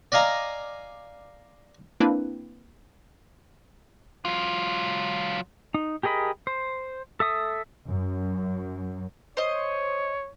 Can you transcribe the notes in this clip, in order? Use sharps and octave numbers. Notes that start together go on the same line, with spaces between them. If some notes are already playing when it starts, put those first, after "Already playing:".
D5 D#5 F5 G#5 A#5
A#3 C4 D4 E4 B4
F#3 F4
D#4
G4 G#4 A#4 D#5 B5
C5
A4 E5 D#6
F#2
C5 C#5 D#5